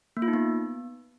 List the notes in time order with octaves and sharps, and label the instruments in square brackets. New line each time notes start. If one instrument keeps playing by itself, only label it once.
[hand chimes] A#3
F4
D#4
B3